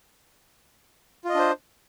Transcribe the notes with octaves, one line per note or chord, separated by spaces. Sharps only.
D4 F4 C5 D#5